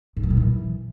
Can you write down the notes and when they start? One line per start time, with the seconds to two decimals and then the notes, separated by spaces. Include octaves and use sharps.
0.17 G#2
0.23 F#3
0.30 A#2
0.37 E3